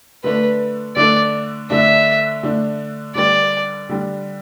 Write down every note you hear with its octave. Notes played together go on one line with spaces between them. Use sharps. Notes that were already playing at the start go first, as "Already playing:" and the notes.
D3 A3 D4 B4
D3 A3 D4 D5
D3 A3 D4 E5
D3 A3 D4
D3 G3 D4 D5
D3 G3 D4